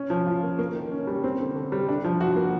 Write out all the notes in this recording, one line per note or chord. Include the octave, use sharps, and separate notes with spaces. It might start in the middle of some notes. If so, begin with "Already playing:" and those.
Already playing: C#4
F3
F4
A#3
A#3
D#3
C#4
G3
C4
D3
D3
G3
D4
F3
F#4
A#3